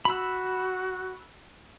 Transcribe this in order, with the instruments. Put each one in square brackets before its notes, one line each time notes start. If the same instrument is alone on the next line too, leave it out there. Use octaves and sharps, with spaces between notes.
[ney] F#4 [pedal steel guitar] B5 E6